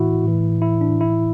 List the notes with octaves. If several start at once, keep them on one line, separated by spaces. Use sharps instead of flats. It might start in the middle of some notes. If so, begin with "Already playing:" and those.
Already playing: A2 E3 E4 F#4
A2 E3
E4
D4
A2 E3 E4